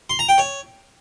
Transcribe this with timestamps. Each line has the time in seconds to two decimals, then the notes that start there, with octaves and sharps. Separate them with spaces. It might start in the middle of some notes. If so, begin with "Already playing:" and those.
0.10 C6
0.19 A#5
0.29 G5
0.38 C#5